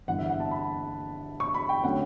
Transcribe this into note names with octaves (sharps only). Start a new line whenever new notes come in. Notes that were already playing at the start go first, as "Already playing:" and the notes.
G1 G2 E3 B3 F#5
E5
F#5
A5
B5
C#6
B5
G5
D3 F#3 A3 C#4 F#5